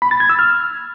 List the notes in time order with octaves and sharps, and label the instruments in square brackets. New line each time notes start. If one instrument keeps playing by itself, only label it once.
[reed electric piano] B5
A6
G#6
E6
F6